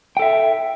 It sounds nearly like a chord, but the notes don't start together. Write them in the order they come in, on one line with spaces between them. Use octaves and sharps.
G5 A4 E5